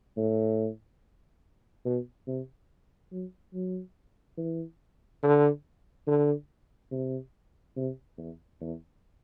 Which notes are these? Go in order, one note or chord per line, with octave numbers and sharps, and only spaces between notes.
A2
B2
C3
F#3
F#3
E3
D3
D3
C3
C3
E2
E2